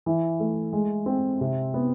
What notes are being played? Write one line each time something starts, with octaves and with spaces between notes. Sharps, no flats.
E3
A3
G#3
C4
C3
B3